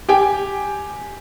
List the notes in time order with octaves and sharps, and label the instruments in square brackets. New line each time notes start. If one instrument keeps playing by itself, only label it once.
[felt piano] G4 G5 G#5